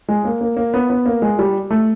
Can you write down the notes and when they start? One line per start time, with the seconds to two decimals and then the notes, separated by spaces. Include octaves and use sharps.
0.09 G#3
0.25 A#3
0.41 A#3
0.57 A#3
0.74 B3
0.90 B3
1.06 A#3
1.22 G#3
1.39 G3
1.71 A3